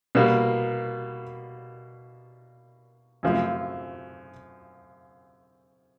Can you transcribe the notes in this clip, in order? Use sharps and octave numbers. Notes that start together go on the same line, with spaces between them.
B2 G3 A#3
F#2 C#3 F3 A3 C4